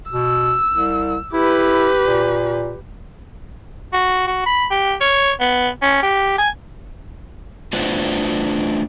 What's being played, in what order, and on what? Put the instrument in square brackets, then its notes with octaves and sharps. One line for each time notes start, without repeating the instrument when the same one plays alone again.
[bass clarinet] B2 [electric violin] E6
[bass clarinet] C2
[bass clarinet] E4 [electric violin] G4 B4
[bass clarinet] A#2
[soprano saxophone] F#4
F#4
B5
G4
C#5
B3
C#4
G4
G#5
[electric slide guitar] A3 D4 F4 B4 C5 F#5